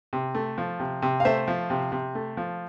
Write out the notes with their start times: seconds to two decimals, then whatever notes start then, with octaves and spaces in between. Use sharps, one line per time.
0.13 C3
0.35 A3
0.58 F3
0.80 C3
1.02 C3
1.20 F5
1.25 A3 C5 E5
1.48 F3
1.70 C3
1.92 C3
2.15 A3
2.37 F3